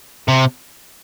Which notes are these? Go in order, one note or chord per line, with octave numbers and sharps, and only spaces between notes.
C3